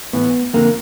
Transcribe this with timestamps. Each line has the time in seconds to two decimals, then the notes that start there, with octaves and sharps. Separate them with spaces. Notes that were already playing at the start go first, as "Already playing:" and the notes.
0.13 A2 E3 B3
0.53 F2 D3 A#3